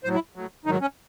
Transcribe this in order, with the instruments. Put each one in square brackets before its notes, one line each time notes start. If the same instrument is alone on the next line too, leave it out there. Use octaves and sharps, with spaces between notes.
[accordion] A2 F#3 C5
E4
A2 F#3
G#2 D#3 F#3 D#4
C#4